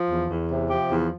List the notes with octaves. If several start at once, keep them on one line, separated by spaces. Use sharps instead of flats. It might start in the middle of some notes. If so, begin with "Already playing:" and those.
Already playing: F3
E2
E2
C3
F3 G4
E2